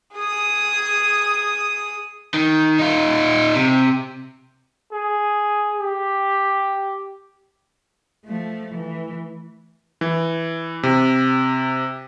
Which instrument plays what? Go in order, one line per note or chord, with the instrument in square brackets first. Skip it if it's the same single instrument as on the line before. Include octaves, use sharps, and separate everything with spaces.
[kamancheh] G#4 D#6
[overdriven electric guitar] D#3
D#4 F4
C3
[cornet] G#4
G4
[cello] F3 A3
E3
[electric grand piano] E3
C3